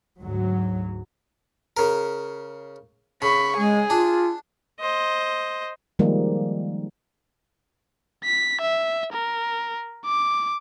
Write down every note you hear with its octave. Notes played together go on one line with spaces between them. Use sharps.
D2 G#2 F#3
C#3 A#4
C#3 B5 C#6
G#3 G#4
D4 F4
C5 D#5
D#3 F3 G3 G#3 A#3 D#4
B6
E5
A#4
D6